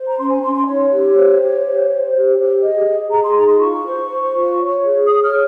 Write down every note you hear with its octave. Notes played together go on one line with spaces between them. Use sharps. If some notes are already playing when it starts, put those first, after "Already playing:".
Already playing: C5
A#5
C#4 C6
G#5
C#4 C6
C6
D#4 C#5
G4
C5
G4
C5
C5
G4
G4
G#4 D#5
G#4
G#4 A#5
C6
D#4 A#5
C6
F4 C#6
C5
C5
F4
C#5
G#4
C#5 D#6
F6
G#4